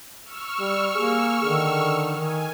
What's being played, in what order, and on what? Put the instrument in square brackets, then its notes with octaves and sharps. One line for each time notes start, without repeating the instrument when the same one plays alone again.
[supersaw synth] C#6 E6 F6
[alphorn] G3
[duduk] A#3 [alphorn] G#4
[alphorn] D3 [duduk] D#3
[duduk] D#3 [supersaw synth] G#5